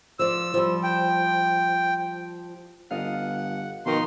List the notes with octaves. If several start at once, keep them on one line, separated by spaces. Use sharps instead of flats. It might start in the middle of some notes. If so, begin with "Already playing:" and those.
F3 D5 E6
F3 G3
G5
G1 F4 D#5 F5 F#5
B2 D#3 F3 D#4 C6